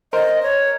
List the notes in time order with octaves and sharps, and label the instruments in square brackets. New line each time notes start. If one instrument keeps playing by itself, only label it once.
[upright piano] A#4 C5 [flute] D#5
[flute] C#5